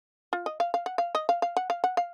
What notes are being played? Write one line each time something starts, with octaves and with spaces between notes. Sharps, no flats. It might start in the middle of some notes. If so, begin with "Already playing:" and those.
F4
D#5
F5
F5
F#5
F5
D#5
F5
F5
F#5
F5
F#5
F5